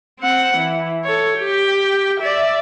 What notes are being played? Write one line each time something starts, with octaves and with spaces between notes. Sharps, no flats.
C4 F#5
E3
A4 C#5
G4 G5
D5 E5